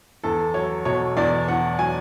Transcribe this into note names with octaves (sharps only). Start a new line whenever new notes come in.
E2 A4
F#3 C#5
B2 C#5
E2 D5
E2 F#5
F#3 G#5